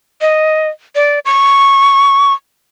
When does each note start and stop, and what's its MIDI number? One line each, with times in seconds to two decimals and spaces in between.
0.21 0.68 75
0.95 1.19 74
1.25 2.33 85